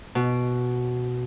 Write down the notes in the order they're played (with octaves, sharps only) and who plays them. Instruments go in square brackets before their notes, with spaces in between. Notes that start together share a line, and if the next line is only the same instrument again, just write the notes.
[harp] B2